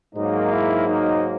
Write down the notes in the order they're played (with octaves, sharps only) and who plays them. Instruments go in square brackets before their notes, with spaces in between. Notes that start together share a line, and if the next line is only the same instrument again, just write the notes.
[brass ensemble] G#2 F#3 A#3 [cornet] D#4
[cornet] E4
D#4